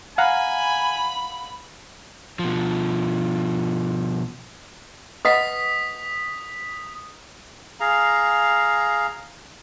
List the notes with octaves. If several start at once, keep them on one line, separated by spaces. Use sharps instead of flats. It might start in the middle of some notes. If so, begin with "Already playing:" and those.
F5 F#5 G#5 A#5 B5
B2 F3
B4 D#5 F#5 D#6 B6
G#4 F5 A#5